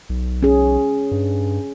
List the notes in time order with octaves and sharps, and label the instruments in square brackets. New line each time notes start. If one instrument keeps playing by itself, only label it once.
[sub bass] B1
[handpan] C#4 G#4
[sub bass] G2